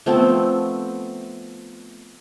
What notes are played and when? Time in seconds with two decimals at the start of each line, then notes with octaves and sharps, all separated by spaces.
0.06 F3 A3 B3 C4